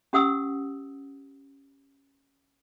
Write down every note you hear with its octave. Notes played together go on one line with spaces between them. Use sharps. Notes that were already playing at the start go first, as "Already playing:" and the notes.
C#4 G4 F#5 D#6 E6